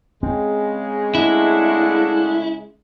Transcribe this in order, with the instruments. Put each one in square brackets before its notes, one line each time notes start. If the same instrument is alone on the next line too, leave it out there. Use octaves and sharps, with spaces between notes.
[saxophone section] C#3 G#3 [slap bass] C4
[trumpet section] A3 D4 F#5 [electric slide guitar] E4